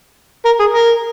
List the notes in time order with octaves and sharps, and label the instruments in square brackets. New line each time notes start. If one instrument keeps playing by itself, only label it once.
[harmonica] A#4
G#4
A#4